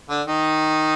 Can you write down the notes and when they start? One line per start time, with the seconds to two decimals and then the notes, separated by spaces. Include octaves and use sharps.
0.09 D3 D4
0.27 D#3 D#4